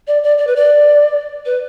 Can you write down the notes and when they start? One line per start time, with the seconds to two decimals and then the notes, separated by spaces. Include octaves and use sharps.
0.07 D5
0.23 D5
0.38 D5
0.47 B4
0.56 D5
1.46 B4